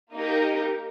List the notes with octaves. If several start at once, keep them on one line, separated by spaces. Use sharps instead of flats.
A#3 D#4 G4 A#4